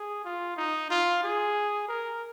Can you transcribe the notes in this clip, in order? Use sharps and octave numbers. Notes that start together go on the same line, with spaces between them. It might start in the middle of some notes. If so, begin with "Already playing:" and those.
Already playing: G#4
F4
D#4
F4
G#4
A#4